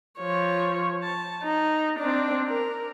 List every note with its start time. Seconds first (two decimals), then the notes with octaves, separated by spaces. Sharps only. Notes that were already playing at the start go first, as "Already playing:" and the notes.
0.19 F3 C#5
1.03 A5
1.43 D#4
1.99 C4 D4
2.48 A#4